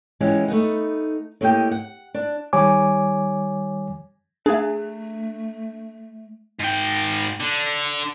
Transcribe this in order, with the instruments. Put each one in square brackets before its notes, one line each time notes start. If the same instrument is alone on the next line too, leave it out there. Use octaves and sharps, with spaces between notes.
[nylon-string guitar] E3 G#3 C#4 F4 G4
A3 B3 D#4 F#5
A2 A#3 G4 D#5 F5 G5
F#5
D4
[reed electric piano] D#3 G3 C#5 G#5 D6
[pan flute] A3 [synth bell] D4 [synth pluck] G#4 E5
[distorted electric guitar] G#2 G5
D3